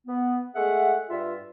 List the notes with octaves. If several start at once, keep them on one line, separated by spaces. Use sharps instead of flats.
B3
G#3 A3 G#4 E5 F#5
G2 F4 E5